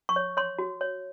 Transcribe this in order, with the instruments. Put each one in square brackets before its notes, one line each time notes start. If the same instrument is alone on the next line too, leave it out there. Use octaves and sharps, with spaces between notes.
[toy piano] C#6
C#5
C#5 C6
F#4
C#5